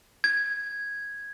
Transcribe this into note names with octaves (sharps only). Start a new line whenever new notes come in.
G#6